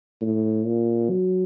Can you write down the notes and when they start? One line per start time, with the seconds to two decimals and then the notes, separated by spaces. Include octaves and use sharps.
0.21 A2
0.66 A#2
1.10 F#3